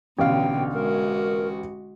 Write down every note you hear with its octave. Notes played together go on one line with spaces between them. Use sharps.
A1 B2 D3 F5 G5
G#3 F#4 A#4